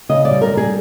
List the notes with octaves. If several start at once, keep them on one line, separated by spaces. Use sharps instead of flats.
C#3 D#5
D5
G3
A#4
G3
G#4